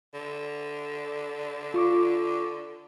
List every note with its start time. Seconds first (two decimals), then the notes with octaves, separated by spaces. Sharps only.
0.14 D3
1.74 F4 C#6 D6